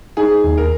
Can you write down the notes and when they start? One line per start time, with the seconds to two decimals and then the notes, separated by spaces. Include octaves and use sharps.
0.17 D#4 G#4
0.44 D#2
0.58 A#4